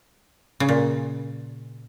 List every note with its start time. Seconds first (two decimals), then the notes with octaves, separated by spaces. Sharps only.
0.60 C#3
0.69 A#2